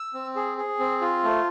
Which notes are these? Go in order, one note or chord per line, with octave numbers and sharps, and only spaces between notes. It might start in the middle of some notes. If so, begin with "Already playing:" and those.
Already playing: E6
C4
G#4
G#4
C4
F4
A3